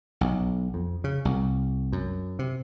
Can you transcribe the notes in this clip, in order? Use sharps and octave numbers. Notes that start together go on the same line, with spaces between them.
B1
F2
C#3
C2
F#2
C3